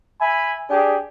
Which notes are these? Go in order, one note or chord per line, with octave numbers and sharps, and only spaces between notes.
E5 G#5 B5
D4 G4 G#4